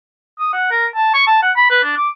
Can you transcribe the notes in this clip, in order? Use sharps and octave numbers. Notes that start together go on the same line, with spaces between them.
D#6
F#5
A#4
A5
C#6
A5
F#5
B5
B4
D4
D6